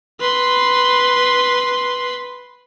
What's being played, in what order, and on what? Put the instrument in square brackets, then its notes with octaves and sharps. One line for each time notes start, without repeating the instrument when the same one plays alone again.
[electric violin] B4 C6